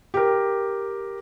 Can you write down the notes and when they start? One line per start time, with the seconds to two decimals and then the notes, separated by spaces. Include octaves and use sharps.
0.14 G4 A#4